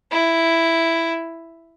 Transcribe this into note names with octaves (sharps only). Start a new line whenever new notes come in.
E4